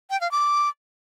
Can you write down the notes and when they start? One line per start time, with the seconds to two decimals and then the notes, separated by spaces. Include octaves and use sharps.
0.10 G5
0.21 F5
0.32 D6